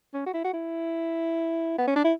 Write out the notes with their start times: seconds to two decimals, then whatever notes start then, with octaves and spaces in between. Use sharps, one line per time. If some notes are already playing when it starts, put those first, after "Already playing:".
0.14 C#4
0.26 F#4
0.33 E4
0.44 F#4
0.53 E4
1.78 B3
1.87 C#4
1.96 D4
2.04 E4